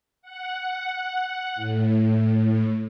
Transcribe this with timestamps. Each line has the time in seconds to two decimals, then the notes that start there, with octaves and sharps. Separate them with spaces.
0.22 F#5
1.56 A2